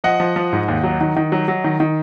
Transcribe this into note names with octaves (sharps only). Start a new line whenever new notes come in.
F3 D#5 F#5
F3
F3
G#2
D#2
F#3
D#3
D#3
F#3
F#3
D#3
D#3